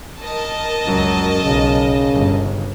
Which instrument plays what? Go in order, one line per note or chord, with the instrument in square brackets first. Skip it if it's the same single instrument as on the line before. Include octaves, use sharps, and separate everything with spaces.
[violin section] A#4 D#5 A5
[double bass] C#2 F#3 [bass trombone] F#2
[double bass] B1 [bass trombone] C#3
[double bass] G1